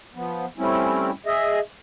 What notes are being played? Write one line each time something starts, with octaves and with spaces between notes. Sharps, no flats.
F3 B3
G3 A3 C4 C#4 E4
G#4 D#5 E5